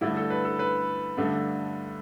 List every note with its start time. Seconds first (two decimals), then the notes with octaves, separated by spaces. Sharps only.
0.01 G2 D3 A3 E4
0.17 A4
0.30 B4
0.45 A4
0.59 B4
1.17 G2 D3 A3